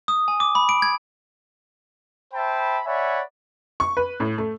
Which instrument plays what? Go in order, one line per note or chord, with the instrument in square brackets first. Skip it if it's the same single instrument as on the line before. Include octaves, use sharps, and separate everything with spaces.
[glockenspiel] D#6
G#5
D6
B5
D7
G#6
[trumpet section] C5 E5 G5 A5 B5
C#5 D5 E5 F#5 G#5 B5
[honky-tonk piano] C#6
B4
A2
A3